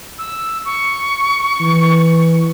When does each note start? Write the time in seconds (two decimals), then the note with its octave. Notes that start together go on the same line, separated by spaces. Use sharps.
0.18 E6
0.65 C#6
1.61 E3